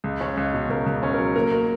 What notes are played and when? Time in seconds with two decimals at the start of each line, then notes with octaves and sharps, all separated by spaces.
0.04 C#2
0.21 C#4
0.37 C#2
0.54 B2
0.70 C#2 A#4
0.86 C#2
1.03 C#4
1.14 F#3 A#4
1.36 A#3 A#4
1.52 A#3